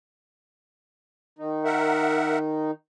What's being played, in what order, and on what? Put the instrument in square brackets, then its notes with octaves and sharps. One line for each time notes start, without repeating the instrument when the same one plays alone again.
[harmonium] D#3 D#4
[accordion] A#4 E5 F#5